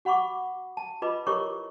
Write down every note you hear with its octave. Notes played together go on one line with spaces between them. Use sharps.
F#4 F#5 B5 C#6 D6
A5
F4 B4 D#5 B5 D6
E4 G4 A#4 C#5 C#6 D6